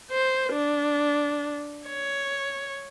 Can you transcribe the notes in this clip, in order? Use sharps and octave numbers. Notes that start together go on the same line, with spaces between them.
C5
D4
C#5